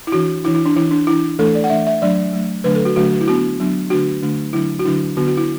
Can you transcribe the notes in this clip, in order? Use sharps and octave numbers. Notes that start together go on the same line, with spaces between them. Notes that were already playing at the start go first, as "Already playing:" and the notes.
E4
E3 D4 F#4
E3 D4 E4
E4
D4
E3 D4 E4
D4
E3 D4 E4
E3 A3 D4 A4
D5
F#5
E3 A3 D4 E5
E5
F#3 A3 D4 D5
F#3 A3 D4
D3 F#3 A3 D4 B4
A4
F#4
D3 F#3 A3 D4 F#4
F#4
E4
F#3 B3 D4 F#4
F#3 B3 D4
D3 A3 D4 F#4
D3 A3 D4
D3 F#3 D4 E4
F#4
D3 F#3 D4 E4
D3 B3 D4 F#4
F#4
E4